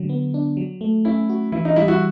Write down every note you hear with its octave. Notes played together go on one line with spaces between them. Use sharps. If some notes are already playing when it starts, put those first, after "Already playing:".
Already playing: D3 F#3
B3
D4
F#3
A3
C#4 E4
F#4
E3 E4
D#4
G3 E4
E4 F#4